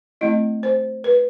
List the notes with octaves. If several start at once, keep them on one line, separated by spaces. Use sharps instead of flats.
A3 C4 E4 D#5
C5
B4